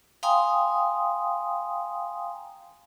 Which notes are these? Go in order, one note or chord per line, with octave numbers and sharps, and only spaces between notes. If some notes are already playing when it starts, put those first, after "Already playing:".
F5 G5 G#5 A#5 C6 D#6